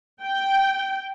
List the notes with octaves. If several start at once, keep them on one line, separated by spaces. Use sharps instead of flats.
G5